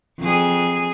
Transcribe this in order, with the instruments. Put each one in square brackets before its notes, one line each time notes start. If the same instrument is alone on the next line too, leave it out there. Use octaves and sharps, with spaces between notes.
[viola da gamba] F2 G#4